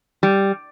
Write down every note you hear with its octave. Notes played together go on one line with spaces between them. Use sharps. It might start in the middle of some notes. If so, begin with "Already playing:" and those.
G3